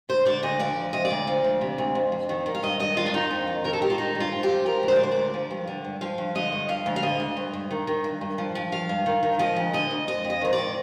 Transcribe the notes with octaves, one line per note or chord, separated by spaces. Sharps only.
D2 C5
D3 D5
D2 D#5
F3 D5
D2
C3 D#5
D5
D2
F3
D2
C3
D2
F2
F2
D#3
D#3
F5
G2 D#5
G2 D#5
D#3 F4
D4
D#3 D#4
F2
F2
D#3 A#4
A4
D#3 G4
F4
G2 D#4
G2
F4
F3
G4
F3
F3 A#4
D2
C5
D5
D3 C5
D2 D5
F3
G2
D3
G2
F3 F5
G2
D3 D#5
G2
F3 F5
D2
F5
D3 D#5
D2
G2
G2
D#3
D#3
G2
G2
F3
F3
G2 F5
G2
D#3
D#3
F3 D#5
D2
D3 D#5
D2
F2 D#5
F2
D#5
D#3 C5
D5
D#3